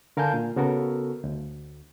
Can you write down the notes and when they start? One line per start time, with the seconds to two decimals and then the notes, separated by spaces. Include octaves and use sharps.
0.17 D3 A#4 F5 G#5 A5 G6
0.34 A#2
0.56 C#3 B3 F#4 A4 A#4
1.24 D2